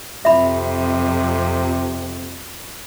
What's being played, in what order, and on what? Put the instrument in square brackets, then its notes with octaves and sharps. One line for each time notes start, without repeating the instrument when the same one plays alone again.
[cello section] F2 [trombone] C3 [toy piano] E5 B5